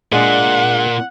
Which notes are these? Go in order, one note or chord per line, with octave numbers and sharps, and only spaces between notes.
A#2 G#3 D4 F#5